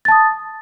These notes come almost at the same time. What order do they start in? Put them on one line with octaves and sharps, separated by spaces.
A6 A5 D#6